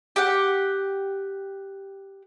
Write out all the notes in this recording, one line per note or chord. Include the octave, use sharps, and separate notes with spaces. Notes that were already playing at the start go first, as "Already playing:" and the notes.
G4 F#5